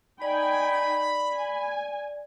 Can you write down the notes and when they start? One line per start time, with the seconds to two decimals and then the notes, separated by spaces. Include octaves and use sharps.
0.22 D#4 D5 G5 G#5 B5
1.35 G#5